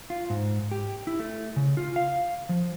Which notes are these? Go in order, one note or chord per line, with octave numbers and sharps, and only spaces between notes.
F4
G#2
G4
E4
A3
C#3
F4
F5
F3